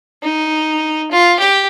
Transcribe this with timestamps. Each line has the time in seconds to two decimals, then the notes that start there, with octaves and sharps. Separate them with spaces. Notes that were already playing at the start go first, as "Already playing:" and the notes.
0.23 D#4
1.11 F4
1.39 G4